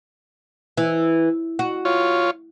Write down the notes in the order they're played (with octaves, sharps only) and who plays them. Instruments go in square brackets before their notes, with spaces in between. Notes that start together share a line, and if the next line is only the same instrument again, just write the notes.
[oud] E3
F#4
[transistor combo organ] F4 C#5